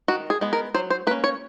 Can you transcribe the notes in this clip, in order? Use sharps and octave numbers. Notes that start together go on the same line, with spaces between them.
D#3 F#4
G#4
G#3 B3
A#4
F#3 C5
C5
A#3 C#4 B4
C#5